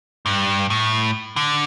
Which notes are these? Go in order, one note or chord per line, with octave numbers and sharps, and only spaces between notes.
G2
A2
D3